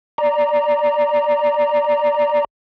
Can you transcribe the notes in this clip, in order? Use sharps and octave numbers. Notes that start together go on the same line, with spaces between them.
D5 A#5